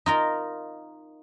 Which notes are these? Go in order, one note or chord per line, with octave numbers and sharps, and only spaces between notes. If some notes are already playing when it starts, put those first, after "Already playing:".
D#4 F4 A#4